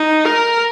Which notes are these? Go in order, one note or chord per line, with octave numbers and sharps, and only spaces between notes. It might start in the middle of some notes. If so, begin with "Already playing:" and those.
Already playing: D#4
A#4